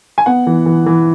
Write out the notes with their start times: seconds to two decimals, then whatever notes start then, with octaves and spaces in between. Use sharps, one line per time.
0.18 G#5
0.26 B3 F#5
0.47 E3
0.66 E3
0.86 E3